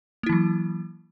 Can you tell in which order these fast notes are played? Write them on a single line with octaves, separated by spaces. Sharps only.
A#3 E4 E3 F#3